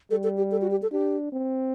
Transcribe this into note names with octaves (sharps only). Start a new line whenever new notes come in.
G3 A4
A4
G4
A4
F#4
G4
A4
D4 G4
C4